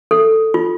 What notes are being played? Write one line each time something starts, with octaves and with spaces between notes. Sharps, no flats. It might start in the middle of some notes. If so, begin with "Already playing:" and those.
A4
F4